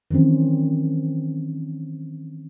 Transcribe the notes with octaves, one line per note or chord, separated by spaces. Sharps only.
D#3 E3 F#3 C4 C#4